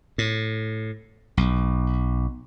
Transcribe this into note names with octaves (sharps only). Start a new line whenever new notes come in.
A2
B1